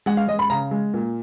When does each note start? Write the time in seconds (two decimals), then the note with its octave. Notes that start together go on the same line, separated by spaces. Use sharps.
0.06 G#3 F#5
0.17 F5
0.28 G#3 D#5
0.39 B5
0.50 C#3 A#5
0.71 G#3
0.94 A#2